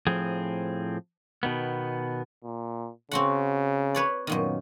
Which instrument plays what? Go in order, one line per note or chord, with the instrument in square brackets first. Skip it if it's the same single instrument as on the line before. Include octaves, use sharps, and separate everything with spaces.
[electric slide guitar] A2 F3 C4 G#4
B2 D#3 B3
[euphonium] A#2
[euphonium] C#3 [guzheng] C4 F#4 F#5
[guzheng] B4 C#5 D5
[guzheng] F#2 A#2 D#3 [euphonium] B3